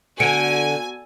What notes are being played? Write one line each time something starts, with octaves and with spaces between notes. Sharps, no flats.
D3 B3 F#4 G#5 C#7 D7